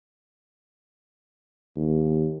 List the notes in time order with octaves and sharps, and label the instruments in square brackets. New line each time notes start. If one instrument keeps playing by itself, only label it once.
[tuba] D#2